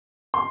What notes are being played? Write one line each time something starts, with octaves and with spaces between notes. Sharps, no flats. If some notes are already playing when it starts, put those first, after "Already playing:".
C6